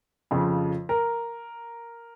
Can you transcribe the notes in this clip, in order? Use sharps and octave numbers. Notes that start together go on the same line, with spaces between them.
F2 C#3 F3
A#4